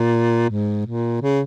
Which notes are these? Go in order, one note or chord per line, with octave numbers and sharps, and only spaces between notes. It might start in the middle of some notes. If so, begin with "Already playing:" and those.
Already playing: A#2
G#2
A#2
C#3